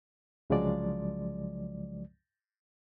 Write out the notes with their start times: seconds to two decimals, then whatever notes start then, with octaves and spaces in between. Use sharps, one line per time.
0.50 C2 C#3 F3 F#3 G#3 D5